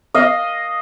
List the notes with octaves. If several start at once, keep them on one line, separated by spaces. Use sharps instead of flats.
D#5 F5